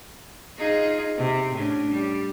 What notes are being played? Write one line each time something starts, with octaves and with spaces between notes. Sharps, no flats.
D#4 F4 G#4
C3
A2 C#4 D4
G3